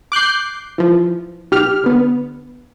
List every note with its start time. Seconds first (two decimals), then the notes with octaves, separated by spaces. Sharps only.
0.12 D6 F#6 G6 C7
0.78 E3 F3
1.51 B1 G4 F6
1.84 D3 B3